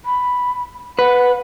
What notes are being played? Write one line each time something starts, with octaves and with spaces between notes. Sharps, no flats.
B5
B4 F#5